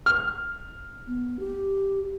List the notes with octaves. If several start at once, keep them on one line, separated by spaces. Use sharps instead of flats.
F6
B3
G4